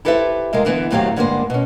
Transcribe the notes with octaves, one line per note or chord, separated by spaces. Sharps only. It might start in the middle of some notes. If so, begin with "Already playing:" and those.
E4 G4 A4 B4 C5 E5
C3 G#3 A#4 F5
D3 E3 B3
D#2 A2 F#3 C4 G4 F5
G2 D3 G#3 A#3 B3 C5
B2 C#4